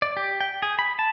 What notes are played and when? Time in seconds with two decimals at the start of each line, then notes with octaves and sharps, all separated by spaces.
0.02 D5
0.17 G4
0.40 G5
0.62 G#4
0.79 B5
0.99 A5